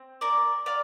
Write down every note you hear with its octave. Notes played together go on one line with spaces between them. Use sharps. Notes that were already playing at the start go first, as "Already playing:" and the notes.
Already playing: C4
A#4 D5
D5 F5